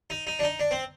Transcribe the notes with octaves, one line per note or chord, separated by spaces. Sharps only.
D#4
D#4
D4
D#4
D4
C4